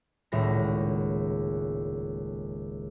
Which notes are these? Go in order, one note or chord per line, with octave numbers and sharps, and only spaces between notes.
D#1 C#2 A2 A#6